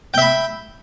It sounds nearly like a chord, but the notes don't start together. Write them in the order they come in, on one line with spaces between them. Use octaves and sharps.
G5 E5 B5